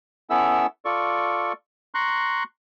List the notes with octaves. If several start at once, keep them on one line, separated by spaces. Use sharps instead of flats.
B3 C#4 E4 A4 E5 E6
F4 A4 D5 C#6
A#5 C6 C#6 F#6